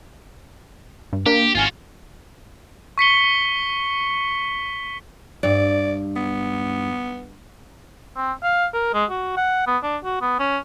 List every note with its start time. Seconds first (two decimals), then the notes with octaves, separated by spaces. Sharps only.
1.13 G2
1.26 A#3 D4 G4
1.55 G#1 F4 F#4 G#5 F6
2.98 C#6 B6 C#7 G7
5.43 G2 D5
6.16 B3
8.16 C4
8.43 F5
8.74 A#4
8.94 G#3
9.10 F#4
9.37 F#5
9.67 B3
9.83 D4
10.04 F#4
10.21 B3
10.39 C#4